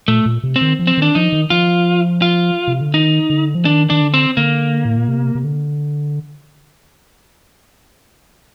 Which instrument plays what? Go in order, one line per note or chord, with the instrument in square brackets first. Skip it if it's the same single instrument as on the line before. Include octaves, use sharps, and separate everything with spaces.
[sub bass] A#2 [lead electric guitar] A3
[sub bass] A#2
C3
[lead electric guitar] C4
[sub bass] D#3
F3
[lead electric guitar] C4
[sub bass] D#3 [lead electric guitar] D4
[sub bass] F3 [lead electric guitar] D#4
[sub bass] D#3
[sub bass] F3 [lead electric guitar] F4
[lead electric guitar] F4
[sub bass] C3
D3
[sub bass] D#3 [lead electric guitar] D#4
[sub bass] D3
F3
[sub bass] D#3 [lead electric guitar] D4
[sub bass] D#3 [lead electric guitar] D4
[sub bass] D3
[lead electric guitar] C4
[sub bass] D3 [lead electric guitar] A#3
[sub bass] A2
A#2
C3
C3
D3